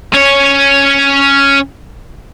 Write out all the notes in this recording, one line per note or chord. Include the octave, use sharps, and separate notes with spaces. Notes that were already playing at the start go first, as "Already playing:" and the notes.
C#4 C#5